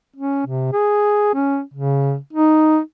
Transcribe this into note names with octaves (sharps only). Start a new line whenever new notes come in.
C#4
C3
G#4
C#4
C#3
D#4